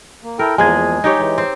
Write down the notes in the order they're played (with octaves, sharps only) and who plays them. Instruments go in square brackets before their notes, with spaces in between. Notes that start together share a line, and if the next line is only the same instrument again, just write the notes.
[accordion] A#3
[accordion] E4 A4 G5 [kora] A#4
[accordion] E2 F3 A#3 [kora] G#3 G#4 [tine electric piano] G#5 G#6
[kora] D#4 G4 C#5
[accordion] E3 G#3
[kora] C4